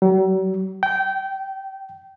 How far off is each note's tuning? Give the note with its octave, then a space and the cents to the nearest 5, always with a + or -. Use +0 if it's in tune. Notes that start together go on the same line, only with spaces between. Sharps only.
F#3 +45
G5 -20